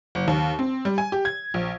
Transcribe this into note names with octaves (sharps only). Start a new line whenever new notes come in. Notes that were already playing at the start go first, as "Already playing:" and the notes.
F#1
D#2
C4
G3
G#5
G4
G#6
A#1